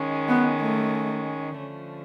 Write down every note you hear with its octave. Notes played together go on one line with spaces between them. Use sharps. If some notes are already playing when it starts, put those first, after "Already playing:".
Already playing: D#3 G#3 C#4
B3
A3
D3 F3 A3 C#4